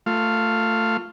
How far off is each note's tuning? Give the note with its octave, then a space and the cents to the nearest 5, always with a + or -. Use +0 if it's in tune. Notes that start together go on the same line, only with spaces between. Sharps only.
A3 +20 F4 +0